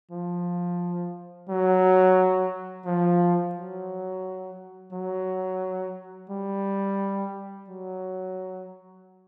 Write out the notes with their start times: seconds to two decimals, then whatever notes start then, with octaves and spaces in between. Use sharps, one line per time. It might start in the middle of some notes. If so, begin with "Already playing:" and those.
0.11 F3
1.49 F#3
2.86 F3
3.55 F#3
4.93 F#3
6.30 G3
7.68 F#3